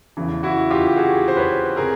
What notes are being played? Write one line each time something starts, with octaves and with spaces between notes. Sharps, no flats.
E2 C#3 E3
E4 F#4
F4 G4
G4
F#4 G#4
C5
B4 C#5
C3 G#4 A#4